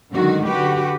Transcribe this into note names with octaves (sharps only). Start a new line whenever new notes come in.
F#2 D3 D#3 G#3 F#4
D3 F#4 G4 B4